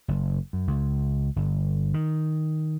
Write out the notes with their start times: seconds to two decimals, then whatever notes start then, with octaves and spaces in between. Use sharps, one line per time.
0.08 F#1
0.53 F#2
0.67 C#2
1.36 G1
1.94 D#3